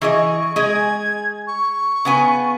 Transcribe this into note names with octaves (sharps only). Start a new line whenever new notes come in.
E3 G#4 D#5 C#6
G#3 G#4 D#5 G#6
C#6
C#3 B3 G#5